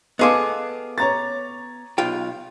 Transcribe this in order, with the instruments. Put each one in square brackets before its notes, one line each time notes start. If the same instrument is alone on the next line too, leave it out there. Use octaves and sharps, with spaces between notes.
[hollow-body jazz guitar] B3 G#4 A4 [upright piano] D#5 F5 D6
[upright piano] C#5 A#5 A6
[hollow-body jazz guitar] B1 F4 G5